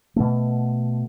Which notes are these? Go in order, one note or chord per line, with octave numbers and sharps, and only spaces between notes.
B2 A3